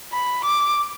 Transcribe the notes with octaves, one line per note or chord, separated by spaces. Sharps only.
B5
D6